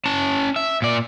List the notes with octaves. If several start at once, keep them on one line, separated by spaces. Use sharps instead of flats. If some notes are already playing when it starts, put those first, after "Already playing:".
C#4 A5
E5
A#2 D5